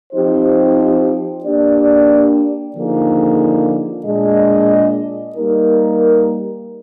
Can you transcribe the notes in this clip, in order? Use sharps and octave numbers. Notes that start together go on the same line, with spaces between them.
F3 C4 D#4 G4 C5
A#3 D4 G4 D5
D3 F3 A#3 D#4 G#4
A#2 G#3 D4 G#4 D#5
G3 A#3 D#4 A#4